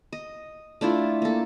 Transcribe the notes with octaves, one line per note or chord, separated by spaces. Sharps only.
D#5
A3 D4 E4 F4
A#3 A4